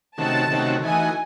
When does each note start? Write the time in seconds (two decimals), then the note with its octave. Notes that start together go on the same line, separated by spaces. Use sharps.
0.18 C3 D#3 A3 C#4 F#4 A5
0.51 C3 D#3 A3 C#4 F#4
0.83 E3 A3 D#4 F#4 G#5